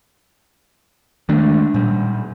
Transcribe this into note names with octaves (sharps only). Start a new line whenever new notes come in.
D#3 G#3 A3 D4
A#2 G3